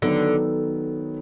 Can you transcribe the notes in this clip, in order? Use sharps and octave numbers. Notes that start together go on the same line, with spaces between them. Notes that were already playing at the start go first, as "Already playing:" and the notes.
D3 D#3 F#3 B3 D#4